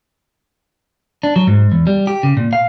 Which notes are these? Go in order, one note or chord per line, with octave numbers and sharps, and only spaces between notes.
D4
F#3
G#2
E2
G3
G4
C#3
A#2
F5